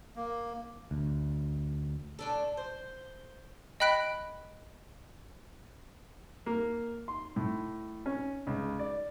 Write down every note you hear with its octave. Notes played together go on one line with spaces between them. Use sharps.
A#3
D2
A2 D4 A4
C5
D#5 G5 B5 F#6 B6 D7
A#3
C6
A2
C#4
C#2
D5